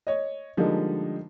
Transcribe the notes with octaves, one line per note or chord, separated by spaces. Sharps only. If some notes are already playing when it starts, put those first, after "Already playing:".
C#5 D#5
D3 F3 G3 G#3 A#3 D#4